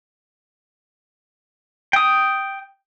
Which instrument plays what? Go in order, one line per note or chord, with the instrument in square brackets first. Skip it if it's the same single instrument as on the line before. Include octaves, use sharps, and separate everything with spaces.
[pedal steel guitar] G5 D#6